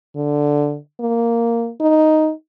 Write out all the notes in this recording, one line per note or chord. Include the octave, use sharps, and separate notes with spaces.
D3
A#3
D#4